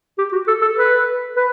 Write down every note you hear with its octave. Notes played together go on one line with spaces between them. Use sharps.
G4
F#4
A4
A4
B4
B4